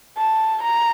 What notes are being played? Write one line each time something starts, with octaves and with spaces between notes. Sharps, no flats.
A5
A#5